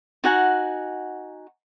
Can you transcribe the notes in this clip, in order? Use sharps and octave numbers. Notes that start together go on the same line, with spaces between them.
D#4 F#4 F#5 G#5